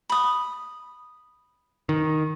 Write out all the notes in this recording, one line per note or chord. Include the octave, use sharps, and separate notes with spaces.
B5 D#6
D#3